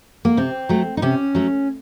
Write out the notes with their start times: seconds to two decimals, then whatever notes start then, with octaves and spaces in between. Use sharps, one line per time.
0.25 A#3
0.37 C3 C4
0.69 F#3 A3
0.97 D#4
1.02 C3 C#4
1.35 F#3 A3